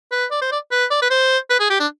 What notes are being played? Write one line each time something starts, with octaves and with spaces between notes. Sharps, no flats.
B4
D5
C5
D5
B4
D5
B4
C5
B4
G#4
G4
D4